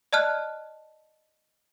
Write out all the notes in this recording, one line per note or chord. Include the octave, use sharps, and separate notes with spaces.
D5 D#5 A5 F6 F#6